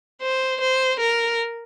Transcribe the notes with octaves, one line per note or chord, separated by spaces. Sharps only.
C5
C5
A#4